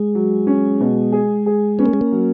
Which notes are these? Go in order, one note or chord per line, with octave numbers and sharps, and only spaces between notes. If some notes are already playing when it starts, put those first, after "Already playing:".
Already playing: G#3
F#3
C#4
B2
G#4
G#4
B3 C#4
A#3
G#3
A#3
F#3